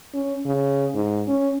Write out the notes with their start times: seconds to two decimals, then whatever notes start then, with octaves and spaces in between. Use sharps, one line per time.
0.14 C#4
0.46 C#3
0.95 G#2
1.28 C#4